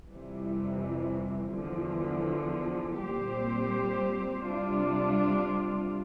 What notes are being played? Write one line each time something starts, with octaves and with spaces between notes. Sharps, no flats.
F2 C3 E3 G3
E2 D3 F3
A#2 G3 C4 G4 C5
C3 G3 D4 F4